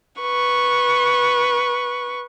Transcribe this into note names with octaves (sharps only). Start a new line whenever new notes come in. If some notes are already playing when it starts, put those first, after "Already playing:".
B4 C#6